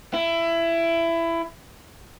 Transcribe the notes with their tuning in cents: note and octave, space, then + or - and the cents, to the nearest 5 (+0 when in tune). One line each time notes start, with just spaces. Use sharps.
E4 +20